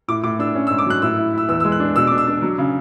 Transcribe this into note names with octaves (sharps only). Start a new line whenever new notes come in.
A2 D6
A2 D6
D4 E6
C#4
E6
G#2
D6
F#3 F#6
A2 E6
E4
E4 E6
E2 E6
E6
G#3
F#6
D4
B2 E6
D4 D6
E6
D4
F#3
C#3